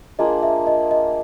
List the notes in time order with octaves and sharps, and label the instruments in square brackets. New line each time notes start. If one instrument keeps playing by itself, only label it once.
[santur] A#3 D4 F4 G#4 [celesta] D#5
[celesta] E5
D#5
D#5